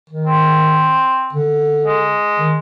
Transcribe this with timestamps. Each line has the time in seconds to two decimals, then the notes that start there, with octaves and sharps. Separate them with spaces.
0.10 D#3
0.27 C4
1.33 D3
1.86 G#3
2.39 D#3